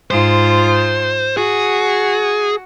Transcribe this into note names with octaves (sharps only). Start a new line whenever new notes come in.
G#2 F4 C5
F#4 G#4